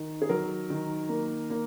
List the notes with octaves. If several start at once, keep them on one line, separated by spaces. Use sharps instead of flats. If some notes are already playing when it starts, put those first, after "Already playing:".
Already playing: D#3
G#4
F#3 A#4
D#3
A#3
A#3